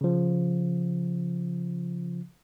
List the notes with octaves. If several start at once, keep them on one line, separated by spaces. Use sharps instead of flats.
C#3 F3